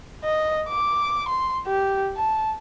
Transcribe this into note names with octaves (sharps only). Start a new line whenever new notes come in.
D#5
D6
C6
G4
A5